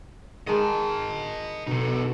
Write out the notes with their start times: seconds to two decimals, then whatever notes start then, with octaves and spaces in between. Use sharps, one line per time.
0.47 D#3 G#3 D#5 A5
1.67 B2 D#4 A4